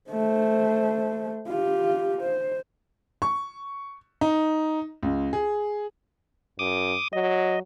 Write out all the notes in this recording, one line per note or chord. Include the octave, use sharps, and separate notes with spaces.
A3 C5
F4 G4
C5
C#6
D#4
C#2
G#4
F#2 D6 D#6
F#3 D#5